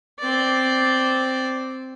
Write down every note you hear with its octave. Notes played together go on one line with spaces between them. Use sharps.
C4 D5